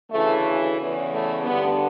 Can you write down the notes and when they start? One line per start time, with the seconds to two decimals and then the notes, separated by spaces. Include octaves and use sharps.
0.11 D2 C#3 E3 A3
0.78 E2 C#3 E3
1.12 A3
1.44 G2 D3 B3